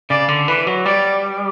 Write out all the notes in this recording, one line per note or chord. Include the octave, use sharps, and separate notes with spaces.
C#3 D5
D3
E3 B4
F#3
G3 D5